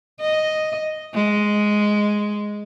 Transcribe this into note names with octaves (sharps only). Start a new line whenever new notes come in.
D#5
G#3